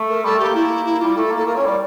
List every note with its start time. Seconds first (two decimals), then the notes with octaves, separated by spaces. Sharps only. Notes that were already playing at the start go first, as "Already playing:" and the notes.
Already playing: A3
0.09 A#4
0.24 G3 A4
0.35 A3 G4
0.45 A#3
0.55 E4
0.86 E4
1.00 G3 F4
1.16 A3 A4
1.31 A#3
1.37 A4
1.46 A#3 A#4
1.56 C#4 C#5
1.66 G3 D5